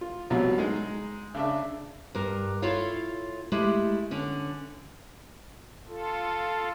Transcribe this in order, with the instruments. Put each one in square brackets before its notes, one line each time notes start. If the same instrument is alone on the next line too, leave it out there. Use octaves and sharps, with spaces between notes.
[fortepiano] F4
C2 B2 F3 F#3
G#3 D#4 G#4
C#3 D4 E5
[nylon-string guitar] G2 A#4
E4 F4 A4 C#5 F5
G#3 A3 E4 G4
D3 C#4
[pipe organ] F4 A4